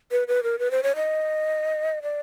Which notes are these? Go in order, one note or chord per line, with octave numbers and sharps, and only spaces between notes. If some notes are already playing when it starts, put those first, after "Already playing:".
B4
B4
A#4
B4
C5
C#5
D#5
D5